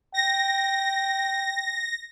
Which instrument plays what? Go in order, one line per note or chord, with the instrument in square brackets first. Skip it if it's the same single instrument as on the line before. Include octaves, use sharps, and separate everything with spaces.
[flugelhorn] G5 [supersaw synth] A#6